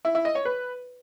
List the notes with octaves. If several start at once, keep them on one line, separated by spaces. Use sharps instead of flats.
E4
E4
D#5
C#5
B4